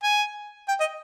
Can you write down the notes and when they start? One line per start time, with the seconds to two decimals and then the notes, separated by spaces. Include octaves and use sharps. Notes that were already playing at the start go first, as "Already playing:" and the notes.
0.03 G#5
0.68 G5
0.80 D#5